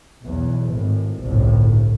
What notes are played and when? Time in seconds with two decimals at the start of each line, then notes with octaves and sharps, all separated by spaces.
0.23 B1 E2
0.68 G#1 A2
1.23 G1 C2 A2